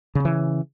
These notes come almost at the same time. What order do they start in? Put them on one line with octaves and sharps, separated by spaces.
C#3 C#4 E3